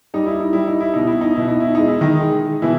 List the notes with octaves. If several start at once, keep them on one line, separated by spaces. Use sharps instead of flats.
G3 D#4
E4
D#4
G3 E4
D#4
E4
B2 D#4
E4
D#4
B2 E4
D#4
E4
G#3 D#4
E4
D#3 D#4
G#3
B2 E3 E4